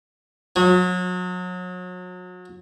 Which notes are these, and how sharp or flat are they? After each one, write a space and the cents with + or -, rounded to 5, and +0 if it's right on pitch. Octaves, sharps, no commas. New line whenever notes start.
F#3 -35